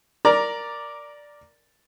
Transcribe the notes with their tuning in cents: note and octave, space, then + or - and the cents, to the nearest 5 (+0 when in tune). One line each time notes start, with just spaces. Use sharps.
A#4 +0 D5 +0 A#5 +15